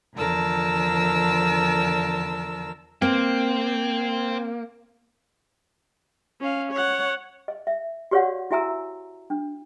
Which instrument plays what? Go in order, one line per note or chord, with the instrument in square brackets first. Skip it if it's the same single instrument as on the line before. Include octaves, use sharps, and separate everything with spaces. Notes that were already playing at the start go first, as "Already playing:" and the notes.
[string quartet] E2 D3 F3 A#4 A5 E6
[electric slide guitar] A#3 [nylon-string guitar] C4 [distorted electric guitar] C5 G5
[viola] C#4 F5
C#5 F#5
[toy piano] D#5
E5
F#4 G4 C#5 D5 F5 F#5
E4 F#4 E5 G#5 A#5 E6
D4